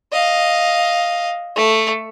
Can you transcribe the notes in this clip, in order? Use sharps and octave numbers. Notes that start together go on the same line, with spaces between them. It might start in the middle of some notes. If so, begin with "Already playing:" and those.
D#5 F5
A3